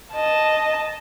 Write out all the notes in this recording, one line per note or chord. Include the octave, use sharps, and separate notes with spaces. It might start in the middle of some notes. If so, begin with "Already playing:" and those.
D#5 A5